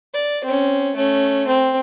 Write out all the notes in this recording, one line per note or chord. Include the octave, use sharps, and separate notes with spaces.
D5
C4 C#4
A3 C#4
C4